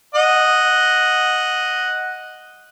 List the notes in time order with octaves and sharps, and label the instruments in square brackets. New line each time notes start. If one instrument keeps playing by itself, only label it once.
[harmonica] D#5 F#5